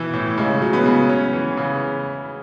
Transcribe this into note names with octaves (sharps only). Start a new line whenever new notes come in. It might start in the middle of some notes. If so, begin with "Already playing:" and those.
Already playing: B2 E3 E4
A2
C#3 G#3
F#3
B3
C#3
C#4
E3
C#3